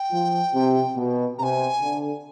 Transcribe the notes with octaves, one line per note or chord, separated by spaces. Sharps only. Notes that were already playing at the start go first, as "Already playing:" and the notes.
Already playing: G5
F3
C3
B2
C3 G#5 A#5
D3